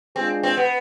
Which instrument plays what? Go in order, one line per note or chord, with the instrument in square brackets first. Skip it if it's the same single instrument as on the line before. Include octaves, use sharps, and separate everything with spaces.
[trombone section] G#3 D4 F4 G#4 [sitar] C4
[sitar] C4
B3